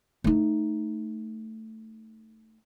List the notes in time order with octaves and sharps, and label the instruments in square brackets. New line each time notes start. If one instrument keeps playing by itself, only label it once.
[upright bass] A3 D#4